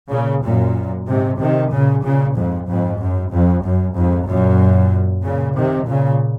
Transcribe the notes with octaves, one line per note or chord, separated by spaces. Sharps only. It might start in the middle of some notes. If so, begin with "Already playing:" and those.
A#2 C#3
F#2 A#2
G#2 C3
C3 D#3
A#2 C#3
A#2 C#3
F2 G#2
F2 G#2
F#2
F2
F#2
F2 G#2
F#2 A#2
A#2 C#3
C3 D#3
A#2 C#3